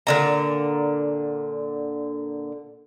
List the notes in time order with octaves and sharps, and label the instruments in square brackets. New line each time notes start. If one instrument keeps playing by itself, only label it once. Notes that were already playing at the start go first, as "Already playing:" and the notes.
[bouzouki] A#2 D3 A#5